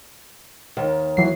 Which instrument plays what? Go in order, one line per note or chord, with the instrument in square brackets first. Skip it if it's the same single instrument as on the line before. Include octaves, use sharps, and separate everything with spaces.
[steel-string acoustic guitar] D#2 D#3
[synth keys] E3 F#3 C7